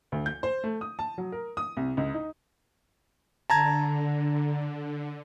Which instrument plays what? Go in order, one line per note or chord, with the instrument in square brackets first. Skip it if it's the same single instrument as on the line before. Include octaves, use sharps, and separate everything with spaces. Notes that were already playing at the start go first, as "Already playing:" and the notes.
[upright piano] D2
G6
C5
A3
D#6
A5
F#3
A#4
D#6
C2
C#2
D#4
[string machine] D3 [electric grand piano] A5 A#5 G#6